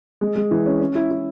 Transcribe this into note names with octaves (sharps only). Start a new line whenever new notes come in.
G#3
G#3
E3
C#4
C#4
E4
E4